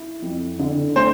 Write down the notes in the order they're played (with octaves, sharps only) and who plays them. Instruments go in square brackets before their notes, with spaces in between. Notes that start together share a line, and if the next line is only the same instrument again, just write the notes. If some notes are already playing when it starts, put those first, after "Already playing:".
Already playing: [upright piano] E4
F2
D3
[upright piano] A3 [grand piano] C5